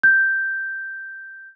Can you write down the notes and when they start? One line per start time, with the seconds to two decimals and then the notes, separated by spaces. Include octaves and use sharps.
0.03 G6